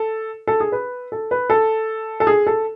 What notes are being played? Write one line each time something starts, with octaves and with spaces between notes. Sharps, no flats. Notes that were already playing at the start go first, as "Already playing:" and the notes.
Already playing: A4
A4
G#4
B4
A4
B4
A4
A4
G#4
A4